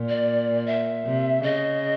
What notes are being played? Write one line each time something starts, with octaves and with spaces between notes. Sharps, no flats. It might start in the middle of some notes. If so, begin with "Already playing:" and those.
Already playing: A#2
D5
E5
C3
C#3 D#5